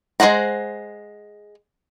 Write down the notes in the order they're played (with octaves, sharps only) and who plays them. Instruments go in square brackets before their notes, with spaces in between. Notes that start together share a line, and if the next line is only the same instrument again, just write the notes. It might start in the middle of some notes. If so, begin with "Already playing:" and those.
[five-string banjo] G#3 B4 C5 F#5 A#5